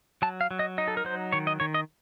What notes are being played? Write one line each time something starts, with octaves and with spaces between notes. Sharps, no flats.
F#3 A5
F5
F#3
D#5
D#4 D#5
A4
A#4
F#3 C5
D#3 C#5
D#5
D#3 C#5
D#5